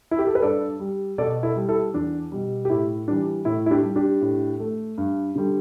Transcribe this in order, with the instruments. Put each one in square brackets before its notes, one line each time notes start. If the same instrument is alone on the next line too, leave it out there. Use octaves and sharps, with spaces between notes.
[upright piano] E4
G4
A4
B4
G2 A4 D5
G3
B2 A4 D5
E4 A4
G3
E4 A4
E2 D4
B2 G3
G4
A2 E4
E3 G3 D4
A2 E4
E4
D4 G4
G3
D4 G4
A2
A3
G2
D3 G3